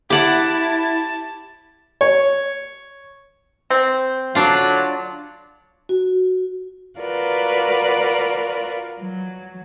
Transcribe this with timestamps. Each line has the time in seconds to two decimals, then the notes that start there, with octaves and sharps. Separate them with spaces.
0.10 E4 G4 F#5 A5 D6
2.01 C#5
3.70 C4
4.35 D3 F#3 D4 F4
5.89 F#4
6.99 F4 F#4 A#4 B4 D5
9.01 F#3